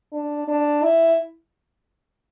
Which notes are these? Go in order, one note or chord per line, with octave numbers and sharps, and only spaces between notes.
D4
D4
E4